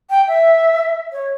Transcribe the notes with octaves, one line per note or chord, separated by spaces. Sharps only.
G5
E5
C#5